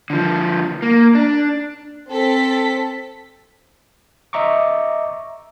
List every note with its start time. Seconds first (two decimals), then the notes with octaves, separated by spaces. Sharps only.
0.10 D3 F3
0.82 A#3
1.15 D4
2.08 C4 A4 B6
4.33 D#5 E5 A#5 C#6 D6